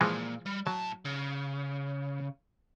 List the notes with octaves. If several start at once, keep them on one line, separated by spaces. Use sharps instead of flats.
A#2 E3 F3 G#3
G3
A2 F#3 A5
C#3